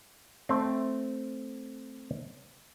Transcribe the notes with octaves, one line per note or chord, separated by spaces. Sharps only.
A3 C4